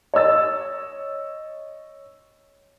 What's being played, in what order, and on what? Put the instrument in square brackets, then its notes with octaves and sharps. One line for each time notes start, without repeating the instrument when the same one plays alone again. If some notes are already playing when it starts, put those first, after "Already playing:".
[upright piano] C#5 D#5 E6 A6